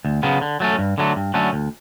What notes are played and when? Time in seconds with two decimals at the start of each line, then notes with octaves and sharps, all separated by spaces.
0.05 D2
0.23 C#3 F#3 B3
0.41 D3
0.60 F#3 A3 C#4
0.79 G2
0.98 D3 F#3 A3
1.16 G2
1.34 D3 F#3 A3 C#4
1.53 D2